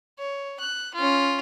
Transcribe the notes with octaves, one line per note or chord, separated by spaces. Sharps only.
C#5
F#6
C#4 F4